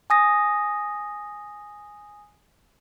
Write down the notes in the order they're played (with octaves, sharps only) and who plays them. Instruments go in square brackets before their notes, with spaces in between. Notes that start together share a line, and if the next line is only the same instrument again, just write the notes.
[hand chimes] G#5 D#6 A#6